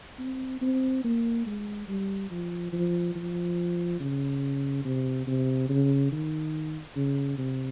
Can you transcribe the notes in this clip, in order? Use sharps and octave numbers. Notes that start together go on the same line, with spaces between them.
C4
C4
A#3
G#3
G3
F3
F3
F3
C#3
C3
C3
C#3
D#3
C#3
C3